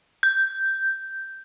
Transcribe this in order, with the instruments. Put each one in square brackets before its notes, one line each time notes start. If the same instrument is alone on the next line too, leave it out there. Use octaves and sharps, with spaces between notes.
[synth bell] G6